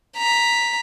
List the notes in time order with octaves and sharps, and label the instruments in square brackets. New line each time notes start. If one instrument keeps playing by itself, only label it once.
[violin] A#5 B6